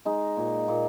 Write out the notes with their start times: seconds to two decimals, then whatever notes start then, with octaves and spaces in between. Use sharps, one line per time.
0.05 G#3 D#4
0.37 A#2
0.68 A#2